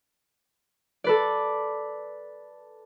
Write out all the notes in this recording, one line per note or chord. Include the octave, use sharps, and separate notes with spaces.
A4 B4 D5